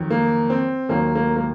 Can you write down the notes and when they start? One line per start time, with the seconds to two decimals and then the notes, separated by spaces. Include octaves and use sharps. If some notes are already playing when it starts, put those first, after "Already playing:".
Already playing: F2 D#3 F#3
0.10 A#3
0.50 C4
0.89 D#2 D#3 F#3 A#3
1.15 A#3
1.36 A#3